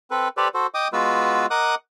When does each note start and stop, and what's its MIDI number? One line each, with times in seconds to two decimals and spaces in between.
0.11 0.28 60
0.11 0.28 69
0.11 0.28 71
0.37 0.48 67
0.37 0.48 69
0.37 0.48 71
0.37 0.48 72
0.37 0.48 74
0.54 0.67 66
0.54 0.67 69
0.54 0.67 72
0.74 0.88 75
0.74 0.88 79
0.74 0.88 86
0.74 0.88 87
0.93 1.46 56
0.93 1.46 59
0.93 1.46 65
0.93 1.46 66
0.93 1.46 71
0.93 1.46 88
1.50 1.75 70
1.50 1.75 75
1.50 1.75 78
1.50 1.75 86
1.50 1.75 87
1.50 1.75 90